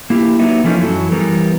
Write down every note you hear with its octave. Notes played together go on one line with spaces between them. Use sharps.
A#3 E4 G4
F#3 A#3 B3 D#4 E5
E3 F3 A3 A#3 C#4 D#4
F#2 E3 F#3 A4
E3 G3 B3 A#4